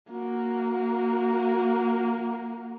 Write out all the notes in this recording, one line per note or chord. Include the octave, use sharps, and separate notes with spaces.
A#3 F#4